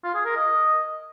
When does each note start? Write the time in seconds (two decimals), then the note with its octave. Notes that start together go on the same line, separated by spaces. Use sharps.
0.04 F4
0.14 G#4
0.25 A#4
0.36 D#5